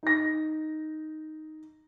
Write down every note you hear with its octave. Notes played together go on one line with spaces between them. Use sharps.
D#4 A#6